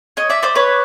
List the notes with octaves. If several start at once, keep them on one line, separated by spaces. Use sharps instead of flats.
C#5 D#5
D5 E5
C5 D5
B4 C#5